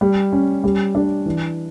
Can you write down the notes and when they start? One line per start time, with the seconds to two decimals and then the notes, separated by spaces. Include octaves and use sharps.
0.01 G3
0.33 C#4
0.64 G3
0.95 D4
1.26 E3